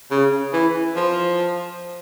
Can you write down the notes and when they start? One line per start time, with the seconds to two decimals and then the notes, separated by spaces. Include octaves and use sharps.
0.11 C#3
0.53 E3
0.96 F3